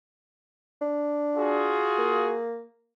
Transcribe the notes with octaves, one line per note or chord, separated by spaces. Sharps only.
D4
F4 F#4 G#4
A#3